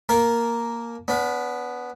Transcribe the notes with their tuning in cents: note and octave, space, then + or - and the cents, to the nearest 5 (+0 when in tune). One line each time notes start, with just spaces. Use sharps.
A#3 +0 A#4 +0 A5 -35
B3 +0 D4 -40